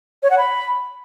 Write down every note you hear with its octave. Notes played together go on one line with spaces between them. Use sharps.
C#5
F#5
B5